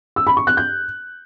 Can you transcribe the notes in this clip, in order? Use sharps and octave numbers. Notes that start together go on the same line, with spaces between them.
E6
B5
C#6
F#6
G6